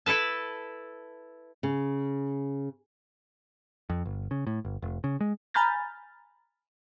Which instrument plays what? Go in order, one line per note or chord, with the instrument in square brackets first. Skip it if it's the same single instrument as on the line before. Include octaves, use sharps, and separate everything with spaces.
[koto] E4 A4 B4 A5
[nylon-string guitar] C#3
[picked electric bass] F2
G1
C#3
A2
G1
F1
C#3
G#3
[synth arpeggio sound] G#5 A#5 B5 F6 G6 A6